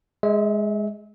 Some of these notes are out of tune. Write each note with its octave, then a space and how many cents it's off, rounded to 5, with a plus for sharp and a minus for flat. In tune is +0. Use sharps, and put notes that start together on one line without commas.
G#3 +0 E5 -35